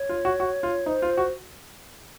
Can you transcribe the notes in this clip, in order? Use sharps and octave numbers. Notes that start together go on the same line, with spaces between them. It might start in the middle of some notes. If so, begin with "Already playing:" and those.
Already playing: C#5
F4
F#4
F#4
F4
D#4 C5
F4
F#4